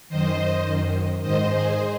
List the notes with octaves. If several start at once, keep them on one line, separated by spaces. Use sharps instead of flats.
F#2 D#3 C5 D#5
F#2 D#3
G#2 D#3 C5 D#5
G#4 C5